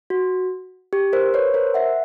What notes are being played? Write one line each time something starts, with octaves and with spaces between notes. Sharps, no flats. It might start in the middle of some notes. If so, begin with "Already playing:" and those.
F#4
G4
A#4 C5
B4 C#5
A#4 C5
E5 F#5